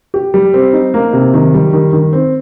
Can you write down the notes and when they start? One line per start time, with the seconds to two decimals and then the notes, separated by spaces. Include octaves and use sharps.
0.14 G4
0.34 G3
0.54 C4
0.73 D#4
0.94 A#3
1.13 C3
1.34 D#3
1.54 G3
1.73 D#3
1.93 D#3
2.13 C4